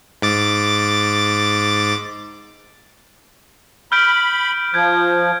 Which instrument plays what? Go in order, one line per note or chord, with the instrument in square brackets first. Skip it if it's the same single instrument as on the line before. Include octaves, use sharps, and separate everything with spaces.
[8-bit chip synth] G#2 D6 A6
[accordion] B5 [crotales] F6 G6 D7
[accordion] F3 [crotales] G6 G#6